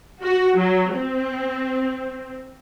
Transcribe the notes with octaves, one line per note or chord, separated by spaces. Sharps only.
F#4
F#3
C4